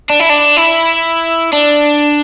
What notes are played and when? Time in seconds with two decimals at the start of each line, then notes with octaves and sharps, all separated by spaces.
0.10 D4
0.20 E4
0.29 D4
0.57 E4
1.52 D4